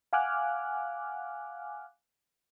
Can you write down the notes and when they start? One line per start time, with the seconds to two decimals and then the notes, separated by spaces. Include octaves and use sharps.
0.13 F5 F#5 G#5 D6 F6 F#6